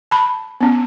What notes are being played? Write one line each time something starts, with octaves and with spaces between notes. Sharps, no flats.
A5 B5
B3 C#4